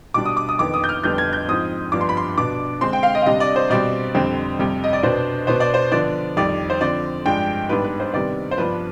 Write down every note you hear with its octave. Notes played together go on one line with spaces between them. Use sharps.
B2 G3 D4 D6
D#6
D6
D#6
F2 D#3 B3 D6
D#6
G6
F6
F2 D3 G3 B3 D4 G6
G#6
G6
G#2 F3 C4 D#6
G2 F3 B3 D4 D6
C6
B5
C6
B2 B3 D4 D6
D3 G#3 C4 C6
G5
F5
D#5
F5
C3 G3 D4 D#5
D5
C5
B2 G3 C4 D5
F2 D3 G3 C4
F2 C3 G3
D#5
D5
B2 B3 D4 C5
B2 B3 D4 C5
D5
C5
D3 F3 B3 D4 D5
F2 D#3 G3 D5
C5
D3 F3 C4 D5
G2 F3 G#3 D4 G5
G#2 G3 B3 D4 B4
B4
C5
C3 D#3 G3 B3 D5
C5
G2 F3 B3 D4 B4